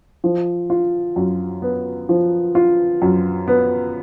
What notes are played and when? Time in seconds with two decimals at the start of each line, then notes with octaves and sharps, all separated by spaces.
0.24 F3
0.70 F4
1.16 F#2
1.62 B3
2.09 F3
2.55 F4
3.02 F#2
3.48 B3